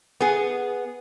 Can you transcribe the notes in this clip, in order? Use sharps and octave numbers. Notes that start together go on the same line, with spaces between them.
B3 G#4